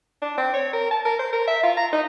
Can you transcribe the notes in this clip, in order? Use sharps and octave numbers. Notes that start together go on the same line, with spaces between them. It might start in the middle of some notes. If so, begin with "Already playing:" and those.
D4
C4
C#5
A#4
A5
A#4
C5
A#4
E5
F4
A#5
D#4